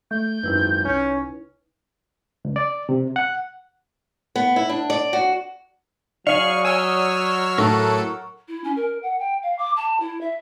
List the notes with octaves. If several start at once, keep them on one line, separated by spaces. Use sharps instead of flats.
A3 G6
G#1 F#2 D#4 E4 B4
C2 C#4
C#2
D5
C3
F#5
B3
E4
D4
D5
F#4
F#3 G#4 D5 F5 C#6 F6
C#5 D#5 G#5 E6 F6
A2 A4 A#4 F#5 C#6
E4
C#4
A#4
F#5
G5
F5
D6
A5
E4
E5